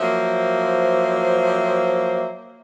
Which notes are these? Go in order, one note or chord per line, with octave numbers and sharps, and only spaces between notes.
F3 F#3 A#3 C5 E5